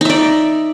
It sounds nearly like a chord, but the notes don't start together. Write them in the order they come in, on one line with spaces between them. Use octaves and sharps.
D#4 E5 D5